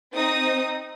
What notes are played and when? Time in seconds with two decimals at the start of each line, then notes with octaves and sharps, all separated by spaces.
0.14 C4 D#4 D#6